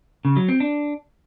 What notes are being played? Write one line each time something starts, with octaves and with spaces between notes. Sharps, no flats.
C#3
F#3
C4
D4